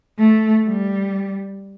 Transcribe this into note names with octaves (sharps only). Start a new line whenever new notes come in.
A3
G3